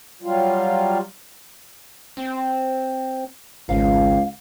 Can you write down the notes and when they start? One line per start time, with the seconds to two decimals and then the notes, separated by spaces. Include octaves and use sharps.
0.22 F#3 G3 F4
2.17 C4
3.69 G#1 C#2 F5